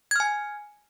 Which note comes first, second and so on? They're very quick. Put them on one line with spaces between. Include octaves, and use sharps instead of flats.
G#6 F6 G#5